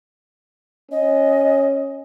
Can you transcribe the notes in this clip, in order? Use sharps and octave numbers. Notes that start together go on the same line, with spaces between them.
C#4 D#5